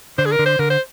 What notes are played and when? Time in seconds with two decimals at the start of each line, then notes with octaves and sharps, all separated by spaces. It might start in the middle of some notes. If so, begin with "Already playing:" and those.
0.18 D3 C5
0.25 G#4
0.32 A#4
0.39 D3
0.46 C5
0.59 D3 A#4
0.70 C5